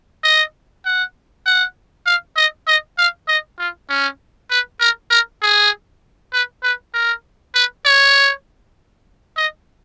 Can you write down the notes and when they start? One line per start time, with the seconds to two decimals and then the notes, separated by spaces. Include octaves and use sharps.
0.24 D#5
0.85 F#5
1.46 F#5
2.06 F5
2.36 D#5
2.67 D#5
2.98 F5
3.28 D#5
3.59 F4
3.89 C#4
4.51 B4
4.80 A#4
5.10 A#4
5.42 G#4
6.33 B4
6.63 B4
6.94 A#4
7.55 B4
7.86 C#5
9.37 D#5